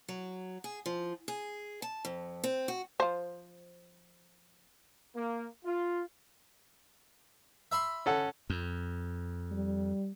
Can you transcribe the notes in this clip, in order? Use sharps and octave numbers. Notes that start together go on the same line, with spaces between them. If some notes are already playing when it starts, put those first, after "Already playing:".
F#3
G#4
F3
G#4
A5
F2
C4
F#4
F3 C5
A#3
F4
E5 B5 C6
C#4 A4 F#5
F2
G3